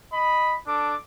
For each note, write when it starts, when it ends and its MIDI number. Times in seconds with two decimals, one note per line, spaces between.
0.13 0.56 75
0.13 0.56 83
0.67 0.97 62
0.67 0.97 69
0.67 0.97 86